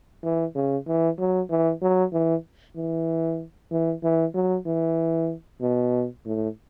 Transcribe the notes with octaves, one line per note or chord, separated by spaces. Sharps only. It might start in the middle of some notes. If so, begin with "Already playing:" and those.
E3
C#3
E3
F#3
E3
F#3
E3
E3
E3
E3
F#3
E3
B2
A2